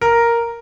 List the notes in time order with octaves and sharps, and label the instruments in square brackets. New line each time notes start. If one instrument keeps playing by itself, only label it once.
[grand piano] A#4